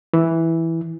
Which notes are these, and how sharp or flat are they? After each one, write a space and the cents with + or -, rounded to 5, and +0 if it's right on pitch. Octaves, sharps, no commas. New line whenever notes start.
E3 -5